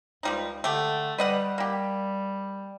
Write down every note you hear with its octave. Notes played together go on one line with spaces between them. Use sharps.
C#2 F3 G3 D#4
D3 A3 G4
G3 B4 D#5 F#5
A#3 G4